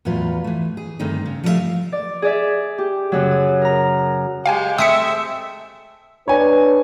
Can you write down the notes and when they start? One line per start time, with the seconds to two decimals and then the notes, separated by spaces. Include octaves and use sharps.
0.05 E2 A2 F#3 F4 B4
0.44 E3 A3
0.77 G#4
0.99 G2 D3 D#3 A3 C4 D#4
1.26 C#3
1.44 F3 G3 A3 F4 E5 F5
1.92 D5
2.22 G#4 D5 E5
2.78 G4
3.12 F#2 C#3 F#3
3.31 D#6
3.61 A#4 A#5
4.46 G#3 G4 F5 G5 G#5
4.78 G#3 A3 C4 E5 D#6 E6 B6 C#7
6.28 D4 B4 C#5 G#5